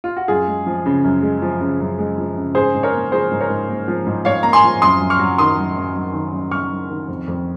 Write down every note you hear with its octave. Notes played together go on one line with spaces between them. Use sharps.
F4
F#4
F#2 F4 G#4
G#3
F3
C#3
F#2
G#3
F3
C#3
F#2
G#3
F3
C#3
G#2 G#4 C5
G#2
A#4 C#5
A#3
F3 G#4 C5
G#2
A#4 C#5
G#2
A#3
F3
G#2
G#2 C#5 F5
A#3 A#5
G#5 C6
F3
F#2 C6 D#6
F#2
C#6 F6
F#3
D#3 C6 D#6
F#2
F#2
F#3
D#3
F#2
F#2 C#6 F6
F#3
D#3
F2
F2